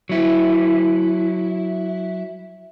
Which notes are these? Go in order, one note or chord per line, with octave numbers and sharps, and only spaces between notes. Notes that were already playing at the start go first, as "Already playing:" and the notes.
F#3 E4